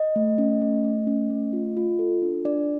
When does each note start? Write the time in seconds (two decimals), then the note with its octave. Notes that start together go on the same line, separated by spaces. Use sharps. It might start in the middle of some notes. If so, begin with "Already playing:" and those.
Already playing: D#5
0.16 A3
0.38 C#4
0.62 A3
0.84 A3
1.07 C#4
1.30 A3
1.53 F4
1.77 F4
1.99 A4
2.22 D4
2.45 D4 D5